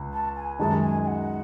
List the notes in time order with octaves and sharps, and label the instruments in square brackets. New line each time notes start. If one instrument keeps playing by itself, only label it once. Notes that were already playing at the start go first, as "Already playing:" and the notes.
Already playing: [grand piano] C#2
[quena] A5
G#5
[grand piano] F#2 D#3 G#3 D#4 [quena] A5
[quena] G#5
G#5
F#5